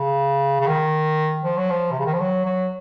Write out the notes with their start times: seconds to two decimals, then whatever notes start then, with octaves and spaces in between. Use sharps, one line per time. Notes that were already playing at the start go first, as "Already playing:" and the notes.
Already playing: C#3
0.60 C#3
0.67 D#3
1.44 F3
1.57 F#3
1.70 F3
1.92 C3
1.99 C#3
2.06 D#3
2.13 F3
2.20 F#3
2.46 F#3